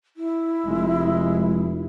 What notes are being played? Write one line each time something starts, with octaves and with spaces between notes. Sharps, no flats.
E4
F1 G#3